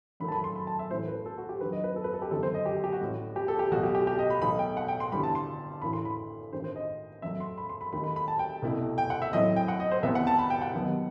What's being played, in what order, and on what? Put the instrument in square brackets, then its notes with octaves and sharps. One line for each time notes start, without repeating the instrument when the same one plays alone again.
[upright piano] F#2 D#3 F#3 A3 B5
A5
B5
C6
B5
A5
E5
A1 A2 E3 A3 C5
B4
A4
F#4
G4
G2 D#3 F#3 B4
D#5
B4
A4
B4
A4
G4
G1 F#2 D#3 A4
C5
D#5
G4
G4
F#4
A1 A2 G3
G4
A4
G4
B1 B2 A3 F#4
G4
G4
G4
D#5
B5
B1 B2 A3 D#4 B5
G5
F#5
G5
C6
G1 G2 E3 G3 B5
A5
C6
A1 A2 E3 A3 E4 B5
C6
B5
A1 G2 D#3 C5
C5
D#5
F#2 F#3 A3 E5
C6
B5
C6
B5
D#2 D#3 A3 D#4 B5
B5
B5
A5
G5
C2 B2 A3 E4
G5
F#5
E5
A2 F#3 C4 E4 D#5
G5
F#5
D#5
C5
C2 C3 E3 B3 E5
F#5
A5
B5
G5
F#5
D#2 D#3 F#3 B3 D#4